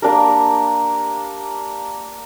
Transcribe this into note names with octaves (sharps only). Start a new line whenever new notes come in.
A#3 D4 G4 A#4